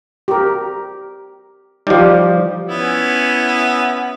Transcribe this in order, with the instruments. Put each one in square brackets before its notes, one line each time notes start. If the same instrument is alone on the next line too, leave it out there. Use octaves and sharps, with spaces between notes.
[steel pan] G4 A#4
[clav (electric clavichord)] F3 G3 [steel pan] D#4 G4
[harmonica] B3 C#4 E4